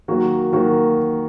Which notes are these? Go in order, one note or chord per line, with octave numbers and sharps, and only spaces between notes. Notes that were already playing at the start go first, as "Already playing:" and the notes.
D#3 F#3 A#3 F#4
D#3 F#3 A#3 F#4